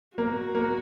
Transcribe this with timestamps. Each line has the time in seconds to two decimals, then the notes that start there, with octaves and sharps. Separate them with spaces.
0.17 A#3 F#4
0.55 A#3